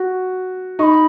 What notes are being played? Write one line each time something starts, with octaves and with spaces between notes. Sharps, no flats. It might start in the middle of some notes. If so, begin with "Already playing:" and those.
Already playing: F#4
D#4 B5 C#6